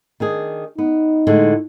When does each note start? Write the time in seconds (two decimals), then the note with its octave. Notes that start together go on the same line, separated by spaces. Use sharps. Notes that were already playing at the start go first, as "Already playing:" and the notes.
0.20 D#3 D4 G#4
0.78 B3 D#4
1.27 A2 D3 G#3